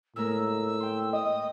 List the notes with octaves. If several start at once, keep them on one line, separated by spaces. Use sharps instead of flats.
A2 G#3 A#3 A#4 E6
G5 C6
D#5 D#6